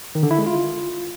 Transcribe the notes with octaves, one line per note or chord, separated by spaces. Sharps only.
D#3
D3
E4
G#3
F4